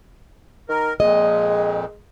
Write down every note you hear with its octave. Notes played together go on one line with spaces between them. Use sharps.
D#3 A#4
F2 A#2 G#3 D#5